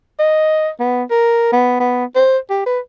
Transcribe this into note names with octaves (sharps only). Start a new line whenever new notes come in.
D#5
B3
A#4
B3
B3
C5
G4
B4